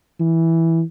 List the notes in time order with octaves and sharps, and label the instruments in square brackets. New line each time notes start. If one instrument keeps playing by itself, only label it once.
[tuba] E3